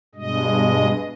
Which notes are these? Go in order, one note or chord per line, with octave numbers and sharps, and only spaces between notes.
G2 B2 G#3 D#5